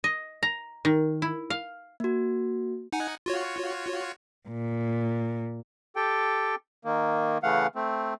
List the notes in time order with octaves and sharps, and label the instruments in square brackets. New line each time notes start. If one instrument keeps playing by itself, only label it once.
[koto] D#5
A#5
D#3
E4
F5
[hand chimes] A#3 F#4
[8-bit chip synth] D#4 F#5 G#5
F4 F#4 C#5
[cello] A#2
[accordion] G4 A4 G5
D#3 A#3
C#3 E3 A3 F5 F#5
A3 C4